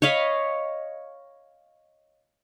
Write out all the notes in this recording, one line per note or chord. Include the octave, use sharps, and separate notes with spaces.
C#5 D#5 F5 B5